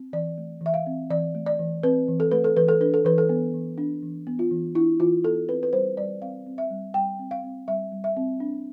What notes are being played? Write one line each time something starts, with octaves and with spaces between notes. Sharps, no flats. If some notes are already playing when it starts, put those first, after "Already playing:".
Already playing: C4
E3 D5
A3
E3 E5
F5
C4
E3 D5
A3
D5
E3
C4 B4
E3
A4
A3 B4
A4
E3 B4
A4
D4 B4
A4
E3 B4
A4
B3
E3
D4
E3
B3
F4
E3
D4 E4
E3 F4
B3 A4
C4 B4
B4
G3 C5
G3 D5
C4 F5
C4
E5
G3
G3 G5
C4
F5
C4
G3 E5
G3
E5
C4
D4